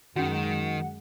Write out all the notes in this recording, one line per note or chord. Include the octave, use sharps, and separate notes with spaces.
F#2 D#3 G#3 C#4 F#4 F#5